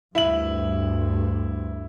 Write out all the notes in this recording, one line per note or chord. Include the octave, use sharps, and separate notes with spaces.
D2 G2 E4 F#7